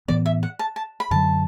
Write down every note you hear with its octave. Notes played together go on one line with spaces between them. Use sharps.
A2 E3 B3 D5
E5
F#5
A5
A5
B5
F#2 D3 F#3 A5